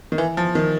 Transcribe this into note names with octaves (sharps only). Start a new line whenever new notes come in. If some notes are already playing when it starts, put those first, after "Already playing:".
D#3
E3
F3
D#3